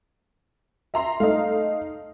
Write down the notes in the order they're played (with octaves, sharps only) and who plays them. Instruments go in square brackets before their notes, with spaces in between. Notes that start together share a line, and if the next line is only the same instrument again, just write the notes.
[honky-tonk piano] E5 A#5 C6
[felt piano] A3 [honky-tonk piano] D#4 F5